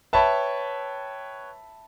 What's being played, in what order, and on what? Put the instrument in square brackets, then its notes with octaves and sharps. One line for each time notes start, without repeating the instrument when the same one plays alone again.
[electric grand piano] B4 C#5 G5 [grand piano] E5 A5 B5